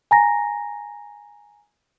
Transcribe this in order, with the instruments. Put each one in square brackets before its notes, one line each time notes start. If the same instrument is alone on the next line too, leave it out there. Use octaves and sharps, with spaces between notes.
[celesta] G#5 A#5 A#6